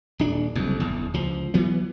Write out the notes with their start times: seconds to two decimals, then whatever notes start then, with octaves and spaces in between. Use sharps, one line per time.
0.19 D#1 D4
0.55 F#1 C2 F2
0.80 F#1 E2
1.14 C#2 F3
1.54 E3 F#3 B3